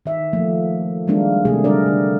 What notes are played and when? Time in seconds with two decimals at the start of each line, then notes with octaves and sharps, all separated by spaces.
0.06 D#3 E5
0.33 F3 A3 A#3
1.08 D#3 G3 G#3 A#3 D4
1.45 C3 A3 A#3 G#4
1.64 D3 G3 D4 A#4 D5
1.86 D3